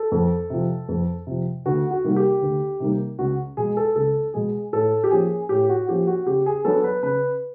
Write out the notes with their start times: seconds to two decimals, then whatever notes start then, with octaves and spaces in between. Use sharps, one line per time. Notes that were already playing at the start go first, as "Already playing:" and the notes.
Already playing: A4
0.12 F2
0.50 C3 F3
0.89 F2
1.27 C3 F3
1.66 D2 F#4
1.91 F#4
2.04 C3 D#3 G3 A#3
2.16 G4
2.42 D2
2.80 C3 D#3 G3 A#3
3.19 C#2 F#4
3.57 B2 G#3 G#4
3.77 A4
3.96 C#2 A4
4.34 B2 G#3 G#4
4.73 A2 A4
5.04 G4
5.11 F3 A#3 C#4 G#4
5.49 A2 G4
5.69 F#4
5.89 F3 A#3 C#4 G4
6.07 F#4
6.27 C#3 G4
6.46 G#4
6.65 F#3 B3 D4 A4
6.84 B4
7.03 C#3 B4